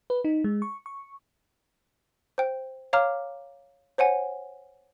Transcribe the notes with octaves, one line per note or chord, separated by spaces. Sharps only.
B4
D#4
G#3
C#6
C#6
C5 G5
C#5 F5 A#5 D6 F6
C5 C#5 F#5 G#5